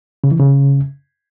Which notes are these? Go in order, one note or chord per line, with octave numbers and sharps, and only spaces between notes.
C#3
E3
C#3